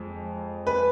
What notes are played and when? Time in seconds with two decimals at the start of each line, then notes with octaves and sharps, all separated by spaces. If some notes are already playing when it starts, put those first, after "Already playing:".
Already playing: F2 G#3
0.67 B4